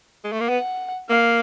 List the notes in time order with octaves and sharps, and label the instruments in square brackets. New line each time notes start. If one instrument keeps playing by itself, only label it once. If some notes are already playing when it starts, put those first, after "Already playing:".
[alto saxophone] G#3
A3
A#3
[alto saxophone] B3 [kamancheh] F#5
[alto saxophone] A#3 [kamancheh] F5